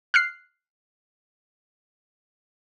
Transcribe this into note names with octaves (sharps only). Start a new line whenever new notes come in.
F6 F#6 C7